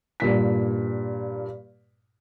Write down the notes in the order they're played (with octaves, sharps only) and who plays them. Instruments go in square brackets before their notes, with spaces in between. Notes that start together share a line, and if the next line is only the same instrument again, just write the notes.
[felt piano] G2 A#2 B6